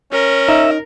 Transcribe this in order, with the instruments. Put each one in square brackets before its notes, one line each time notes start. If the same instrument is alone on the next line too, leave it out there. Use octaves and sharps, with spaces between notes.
[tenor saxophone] C#4 [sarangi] A#4
[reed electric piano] D#4 [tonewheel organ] E5